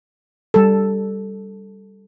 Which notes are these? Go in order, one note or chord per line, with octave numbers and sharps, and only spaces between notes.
G3 A4